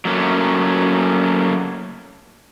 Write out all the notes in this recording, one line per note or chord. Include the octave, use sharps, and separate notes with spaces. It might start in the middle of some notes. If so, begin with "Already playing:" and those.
F#3 A3 A#3 C#4